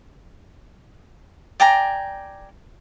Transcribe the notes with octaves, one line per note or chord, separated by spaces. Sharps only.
D5 G5 G#5 A#5